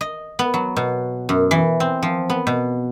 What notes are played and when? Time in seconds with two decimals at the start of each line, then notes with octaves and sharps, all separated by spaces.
0.01 D#5
0.39 B3
0.54 F#3
0.77 B2
1.29 F#2
1.51 E3
1.80 C4
2.03 F3
2.30 B3
2.47 B2